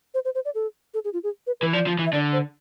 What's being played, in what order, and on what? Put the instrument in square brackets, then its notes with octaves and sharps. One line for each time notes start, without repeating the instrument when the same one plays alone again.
[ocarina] C5
C5
C5
D5
A4
A4
G#4
F4
G#4
B4
[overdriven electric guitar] E3 [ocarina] B4
[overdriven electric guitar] F3 [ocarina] D5
[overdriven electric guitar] F3
E3
[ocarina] E5
[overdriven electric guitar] D3 [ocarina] D5
[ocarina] C5